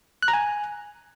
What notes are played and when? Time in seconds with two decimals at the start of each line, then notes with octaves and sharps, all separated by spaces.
0.23 F#6
0.28 A#5
0.33 G#5